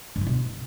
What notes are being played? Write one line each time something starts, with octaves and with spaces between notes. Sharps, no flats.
G2
E3
B2